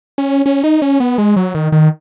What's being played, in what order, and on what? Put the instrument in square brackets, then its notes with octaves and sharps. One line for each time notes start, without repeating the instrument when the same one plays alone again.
[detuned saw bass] C#4
C#4
D#4
C#4
B3
G#3
F#3
D#3
D#3